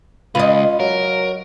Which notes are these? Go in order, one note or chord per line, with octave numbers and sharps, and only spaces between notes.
C#2 F4 B4 D#5
F#3 A#4